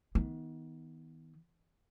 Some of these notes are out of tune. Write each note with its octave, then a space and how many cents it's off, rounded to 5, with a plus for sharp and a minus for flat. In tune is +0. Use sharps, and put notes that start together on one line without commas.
D#3 +35 B3 +0